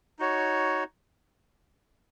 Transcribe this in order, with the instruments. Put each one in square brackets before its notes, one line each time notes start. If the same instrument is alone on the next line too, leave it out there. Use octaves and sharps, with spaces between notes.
[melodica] D#4 F#4 C#5